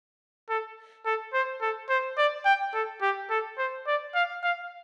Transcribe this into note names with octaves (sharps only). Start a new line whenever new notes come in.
A4
A4
C5
A4
C5
D5
G5
A4
G4
A4
C5
D5
F5
F5